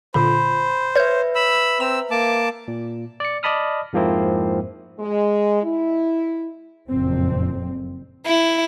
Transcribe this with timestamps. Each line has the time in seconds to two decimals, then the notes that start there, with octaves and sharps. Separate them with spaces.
0.14 A#2 D3 F4 C5 B5
0.96 B4 C#5 E5 G6
1.35 B5 E6
1.80 C4 A#5 E6
2.11 A#3 A5 D6
2.68 A#2
3.20 D5 C#7
3.43 D5 D#5 A5 B5 D#6 F6
3.93 F2 G#2 F3 A#3 C4 E4
4.98 G#3
5.63 E4
6.90 F#1 F2 A#2 C4
8.27 E4